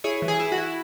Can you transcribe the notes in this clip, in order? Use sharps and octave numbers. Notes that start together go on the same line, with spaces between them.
E4 G#4 C#5
E3
G#4
E4
F#4
E4